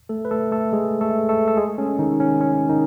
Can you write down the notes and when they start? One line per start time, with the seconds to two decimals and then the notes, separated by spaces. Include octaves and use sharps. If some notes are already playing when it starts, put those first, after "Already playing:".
0.09 A3 A4
0.25 B4
0.31 A3 A4
0.51 A3 A4
0.73 G#3 G#4
1.01 A3 A4
1.29 A3 A4
1.48 A4
1.57 G#3 G#4
1.78 C#4
1.99 D#3 D#4
2.20 C#4
2.41 C#4
2.69 D#3 D#4